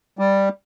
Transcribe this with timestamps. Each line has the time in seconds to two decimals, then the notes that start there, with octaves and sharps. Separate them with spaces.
0.19 G3